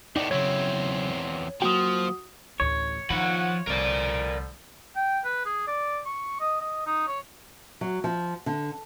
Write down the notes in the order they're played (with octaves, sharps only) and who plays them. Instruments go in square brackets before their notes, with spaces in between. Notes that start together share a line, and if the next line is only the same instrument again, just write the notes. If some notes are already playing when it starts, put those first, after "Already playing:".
[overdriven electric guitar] E2 A2 [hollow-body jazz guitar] D#4 D5 G5
[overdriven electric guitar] E2 C4 [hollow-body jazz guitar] C#3 F#3 [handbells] C#5
[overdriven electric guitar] F3 [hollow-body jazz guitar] F#3 A#3 G5 [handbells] F#4 D#6
[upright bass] A1 D2 [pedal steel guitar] C#5
[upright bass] D#3 [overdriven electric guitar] F3 B5 [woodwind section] F#5
[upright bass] C2 [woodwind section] D3 F3 G3 [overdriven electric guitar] A#4 D5
[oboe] G5
B4
G#4
D5
C#6
D#5
D#5
D#4
C#5
[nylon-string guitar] F#3
F3
D3